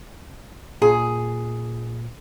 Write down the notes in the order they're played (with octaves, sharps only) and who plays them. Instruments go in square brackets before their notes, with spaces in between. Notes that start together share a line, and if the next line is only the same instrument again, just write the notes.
[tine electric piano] A#2 [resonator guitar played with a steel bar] G#4